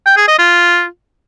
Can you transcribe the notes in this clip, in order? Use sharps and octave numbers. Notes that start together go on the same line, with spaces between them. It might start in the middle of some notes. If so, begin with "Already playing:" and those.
G5
G#4
D#5
F4